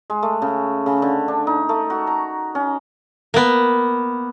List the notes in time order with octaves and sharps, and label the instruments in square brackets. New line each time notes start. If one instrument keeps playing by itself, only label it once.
[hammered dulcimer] G#3
A3
C#3
C#3
D3
D4
D#4
A3
F#4
A#5
C#4
[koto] A#3 B3